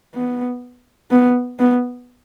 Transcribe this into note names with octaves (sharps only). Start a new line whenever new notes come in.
B3
B3
B3